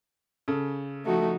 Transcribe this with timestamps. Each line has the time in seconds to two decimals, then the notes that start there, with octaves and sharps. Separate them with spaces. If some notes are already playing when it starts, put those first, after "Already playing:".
0.48 C#3 A4
1.05 F3 A3 D#4 F#4